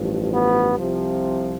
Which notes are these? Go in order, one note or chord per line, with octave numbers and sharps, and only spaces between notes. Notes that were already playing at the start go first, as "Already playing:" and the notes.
Already playing: A1 G2 F3
B3
C2 C3 F3